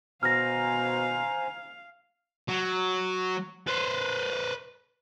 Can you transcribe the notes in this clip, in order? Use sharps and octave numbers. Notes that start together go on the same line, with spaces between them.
B2 C5 F5 G#5 A#5 F6 A#6
F#3
B4 C5